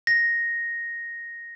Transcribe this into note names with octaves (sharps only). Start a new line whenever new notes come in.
A#6